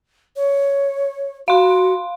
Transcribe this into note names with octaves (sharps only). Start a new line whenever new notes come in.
C#5
F#4 F5 C6